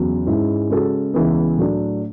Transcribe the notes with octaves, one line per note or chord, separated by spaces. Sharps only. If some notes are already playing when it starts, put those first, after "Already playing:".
Already playing: E2 C#3 F#3
G#2 G#3 C#4 E4
C#3 G#3 C#4 F#4 A4
C#2 C#3 E3 B3
A2 F#3 A3 D4